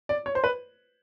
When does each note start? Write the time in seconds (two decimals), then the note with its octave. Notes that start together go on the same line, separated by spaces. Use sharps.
0.09 D5
0.26 C#5
0.35 C5
0.44 B4